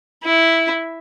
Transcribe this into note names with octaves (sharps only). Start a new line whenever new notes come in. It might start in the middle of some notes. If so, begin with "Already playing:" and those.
E4